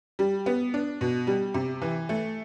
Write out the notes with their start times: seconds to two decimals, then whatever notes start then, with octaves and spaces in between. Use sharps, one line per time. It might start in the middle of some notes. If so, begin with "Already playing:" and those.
0.19 G3
0.46 B3
0.74 D4
1.01 B2
1.27 G3
1.54 C3
1.82 E3
2.09 A3